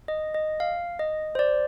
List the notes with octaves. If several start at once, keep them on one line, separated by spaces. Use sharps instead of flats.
D#5
D#5
F5
D#5
C5
D5